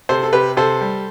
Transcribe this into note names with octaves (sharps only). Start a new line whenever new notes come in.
C3 A4 C5
A4
C3 G4 B4
C3 A4 C5
G3